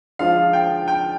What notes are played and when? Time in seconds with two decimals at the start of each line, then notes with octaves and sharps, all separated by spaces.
0.19 F3 G#3 D4 F4 F5
0.53 G5
0.88 G5